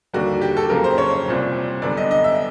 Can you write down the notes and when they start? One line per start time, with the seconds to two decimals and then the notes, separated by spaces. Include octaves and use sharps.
0.13 D#2 D3 G3 A#3 F#4
0.41 G4
0.57 A4
0.70 F2 C#3 F#3 A#3 A#4
0.84 C5
0.98 C#5
1.26 C2 A#2 G3 C4
1.82 F#2 D3 G3 B3 D5
1.97 D#5
2.11 D#5
2.24 E5